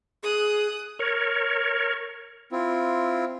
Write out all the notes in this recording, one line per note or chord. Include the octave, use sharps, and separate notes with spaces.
G#4 D#6 F#6
A#4 C#5
C4 E4 F4